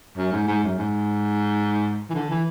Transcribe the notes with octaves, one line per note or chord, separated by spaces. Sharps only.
F#2
G#2
G#2
F#2
G#2
E3
D3
E3